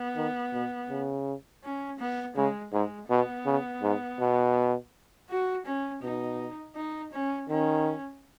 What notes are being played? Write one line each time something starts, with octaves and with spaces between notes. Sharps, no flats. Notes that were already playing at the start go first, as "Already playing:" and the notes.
Already playing: B3
D#3
B2
C#3
C#4
B3
C#3 G#3
G#2 G#3
B2 B3
C#3
G#2
B2
F#4
C#4
B2 D#4
D#4
C#4
D#3 C#4